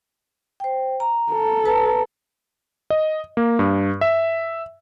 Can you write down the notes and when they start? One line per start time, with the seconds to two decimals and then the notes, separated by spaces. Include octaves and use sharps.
0.60 C5 G5
1.00 A#5
1.32 A4
1.65 B4 A5 A#5
2.90 D#5
3.37 A#3
3.59 G2
4.01 E5